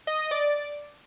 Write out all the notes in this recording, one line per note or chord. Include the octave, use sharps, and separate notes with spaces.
D#5
D#5
D5